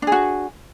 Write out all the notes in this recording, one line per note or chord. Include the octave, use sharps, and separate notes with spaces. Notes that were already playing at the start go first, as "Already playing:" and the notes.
D4 F#4 G#4